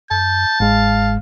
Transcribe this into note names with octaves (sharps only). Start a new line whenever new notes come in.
F#2 A5 G6
G1 G#2 G#3 F5